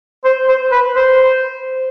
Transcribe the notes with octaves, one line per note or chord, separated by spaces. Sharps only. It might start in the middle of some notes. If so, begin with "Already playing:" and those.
C5
C5
B4
C5